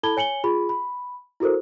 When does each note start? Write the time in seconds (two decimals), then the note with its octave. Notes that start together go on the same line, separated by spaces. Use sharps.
0.03 E4 A4 A5 B5 G#6 G7
0.17 C#5 G#5 C#7 F#7 G7
0.44 F4 G#4 B5
0.69 B5
1.40 E4 F#4 A4 A#4 C5